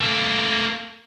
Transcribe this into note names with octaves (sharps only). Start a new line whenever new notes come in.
A3 A#3